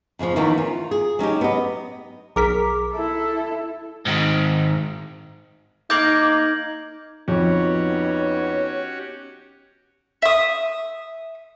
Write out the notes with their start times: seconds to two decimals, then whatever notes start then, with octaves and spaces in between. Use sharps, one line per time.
0.19 F2 C#3 E3 F3
0.36 E2 D#3 E3 A#3 C#4
0.58 F4
0.91 G#4
1.19 F#3 C#4 D#4 G4
1.41 B3 D#5
2.36 B1 G#4 A#4 A#5 D6 B6
2.93 E4 A4
4.06 G#2 D#3
5.90 A#3 D#4 A#4 D6 G6 G#6 F#7
7.28 F2 B3 C#4 D#4 F#4 G4 C#5
10.22 E5 D#6